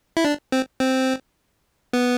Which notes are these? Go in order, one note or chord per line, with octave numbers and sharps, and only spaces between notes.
E4
D4
C4
C4
B3